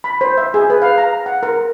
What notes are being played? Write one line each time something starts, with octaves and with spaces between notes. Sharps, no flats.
B5
C5
E5
G#4
B4
F5
A#5
F#5
A#4